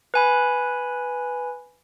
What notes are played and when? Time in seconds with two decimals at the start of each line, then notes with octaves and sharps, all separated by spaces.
0.14 B4 G#5 B5